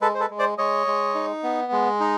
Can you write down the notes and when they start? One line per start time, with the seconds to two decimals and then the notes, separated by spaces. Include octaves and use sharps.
0.01 G#3 A4 B4
0.15 C5
0.20 A4 B4
0.30 G#3
0.39 C5 D5
0.58 G#3 C#5 D#5
0.87 G#3
1.15 D#4
1.43 B3
1.72 G#3
2.00 D#4